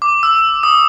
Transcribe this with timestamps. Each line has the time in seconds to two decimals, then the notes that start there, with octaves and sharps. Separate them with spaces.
0.02 D6
0.23 E6
0.63 D#6